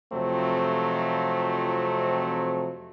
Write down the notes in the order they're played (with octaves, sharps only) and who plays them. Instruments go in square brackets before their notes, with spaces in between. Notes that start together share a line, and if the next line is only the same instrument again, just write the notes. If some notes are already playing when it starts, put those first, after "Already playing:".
[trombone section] F2 C3 F3 F#3 A3 C4